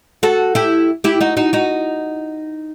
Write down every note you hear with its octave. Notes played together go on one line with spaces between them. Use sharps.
F#4 A4
E4 G4
E4 G4
D#4 F#4
D#4 F#4
D#4 F#4